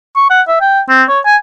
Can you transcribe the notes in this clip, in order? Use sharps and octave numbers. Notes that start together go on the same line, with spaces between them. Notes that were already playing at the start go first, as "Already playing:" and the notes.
C#6
F#5
E5
G5
C4
C#5
G#5